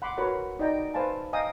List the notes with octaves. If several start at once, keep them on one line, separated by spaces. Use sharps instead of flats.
F#5 B5 C6 D6
F#4 A#4 B4 C#5 F#5
D#4 D5 D#5 G5 A#5
B4 C5 F5 G#5 A5
D#5 F5 G5 G#5 A#5 D#6